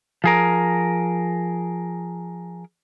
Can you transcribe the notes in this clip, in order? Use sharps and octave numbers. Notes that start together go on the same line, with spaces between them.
F3 G#4 A#4